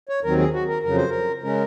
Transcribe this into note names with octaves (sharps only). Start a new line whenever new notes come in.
C#5
D#2 D#3 F#3 C4 A#4
G#4
F#4
A#4
F2 C#3 F#3 A#4
C5
A#4
C#3 G#3 C#4 A#4